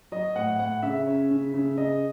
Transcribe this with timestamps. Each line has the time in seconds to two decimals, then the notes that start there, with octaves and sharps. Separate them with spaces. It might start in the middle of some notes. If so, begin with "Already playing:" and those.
0.12 F#3 D#5
0.35 A2 F#5
0.59 A2 F#5
0.82 C#3 E5
1.06 C#4
1.31 C#3
1.54 C#3
1.77 C#3 D#5